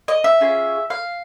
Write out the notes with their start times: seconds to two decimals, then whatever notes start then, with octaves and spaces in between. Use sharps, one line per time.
0.08 D#5
0.24 E5
0.40 C#4 F4 G#4
0.90 F5